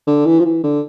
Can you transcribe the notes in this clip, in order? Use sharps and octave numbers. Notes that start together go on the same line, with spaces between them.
D3
E3
F3
E3
D3